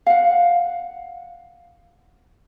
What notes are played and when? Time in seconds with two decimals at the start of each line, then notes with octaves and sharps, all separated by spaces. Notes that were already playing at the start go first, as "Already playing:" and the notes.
0.06 F5 F#5